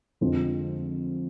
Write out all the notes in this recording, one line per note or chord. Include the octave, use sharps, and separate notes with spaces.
F2 D3 F3 G#3 C4